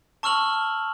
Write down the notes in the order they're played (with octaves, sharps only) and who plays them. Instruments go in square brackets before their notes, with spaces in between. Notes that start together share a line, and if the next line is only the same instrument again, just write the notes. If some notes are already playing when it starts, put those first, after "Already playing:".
[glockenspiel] A5 C#6 E6 F6 F7 F#7